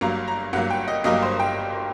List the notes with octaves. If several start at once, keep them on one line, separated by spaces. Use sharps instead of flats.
G1 G2 F#3 A#3 A#5
A#5
G1 G2 F#3 A#3 F#5
G5
D#5
G1 G2 F#3 A#3 D#5
C5
G5